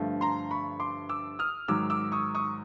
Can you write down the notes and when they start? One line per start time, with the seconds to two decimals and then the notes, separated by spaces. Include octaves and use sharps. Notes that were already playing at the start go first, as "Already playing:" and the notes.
Already playing: G2 D3 F3 A3
0.21 A#5 C6
0.51 B5 C#6
0.80 C6 D6
1.09 D6 E6
1.39 D#6 F6
1.68 G#2 D#3 F#3 D6 E6
1.90 D6 E6
2.12 C#6 D#6
2.35 C#6 D#6